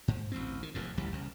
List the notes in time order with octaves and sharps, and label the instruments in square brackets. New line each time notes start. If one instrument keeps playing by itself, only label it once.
[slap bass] G#2
A1 D2 C4
D#3
F1 E2 A2
A1 D2 E3 G3
C2 C#3